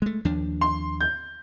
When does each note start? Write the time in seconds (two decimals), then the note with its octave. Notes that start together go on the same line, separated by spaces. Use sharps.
0.02 G#3 A3
0.25 D#2 F3 D4
0.61 C6
1.01 G6